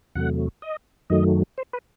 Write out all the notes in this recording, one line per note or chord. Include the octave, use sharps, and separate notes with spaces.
E2 C3 F#3 A3 F#5
D#5
F#2 D#3 F#3 A3 D#5
C5
B4